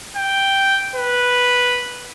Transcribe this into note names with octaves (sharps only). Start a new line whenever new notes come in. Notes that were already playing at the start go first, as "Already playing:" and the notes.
G5
B4